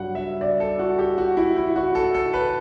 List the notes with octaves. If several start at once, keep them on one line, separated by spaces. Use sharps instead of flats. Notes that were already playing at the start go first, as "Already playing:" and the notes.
Already playing: G2 F#3 F#5
E5
D5
A4
F#4
G4
F#4
E4
E4
F#4
A4
A4
B4